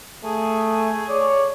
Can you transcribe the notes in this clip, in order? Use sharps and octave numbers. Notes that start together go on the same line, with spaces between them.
A3 G#4
C#5 D5